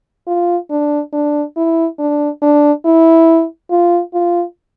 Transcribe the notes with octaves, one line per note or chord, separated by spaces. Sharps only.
F4
D4
D4
E4
D4
D4
E4
F4
F4